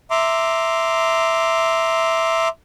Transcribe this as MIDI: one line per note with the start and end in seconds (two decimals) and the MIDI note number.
0.11 2.48 76
0.11 2.48 82
0.11 2.48 84
0.11 2.48 86